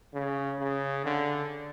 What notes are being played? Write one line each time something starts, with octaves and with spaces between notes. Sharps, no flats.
C#3
C#3
D3